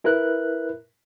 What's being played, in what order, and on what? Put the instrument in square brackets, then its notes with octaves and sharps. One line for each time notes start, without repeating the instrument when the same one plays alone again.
[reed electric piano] E4 A#4 B4 E5 F#6